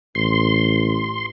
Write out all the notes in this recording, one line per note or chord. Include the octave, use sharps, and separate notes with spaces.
A1 C6